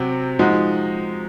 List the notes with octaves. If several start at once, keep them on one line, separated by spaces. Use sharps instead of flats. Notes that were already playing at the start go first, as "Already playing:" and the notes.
Already playing: C3 F#3 C4 F#4
F3 G#3 D#4 F#4